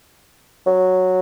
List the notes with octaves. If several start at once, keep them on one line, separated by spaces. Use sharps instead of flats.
F#3